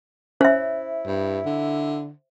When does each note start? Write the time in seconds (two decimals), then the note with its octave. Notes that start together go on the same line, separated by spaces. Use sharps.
0.41 C#4 E4 C5 E5
1.06 G2
1.46 D3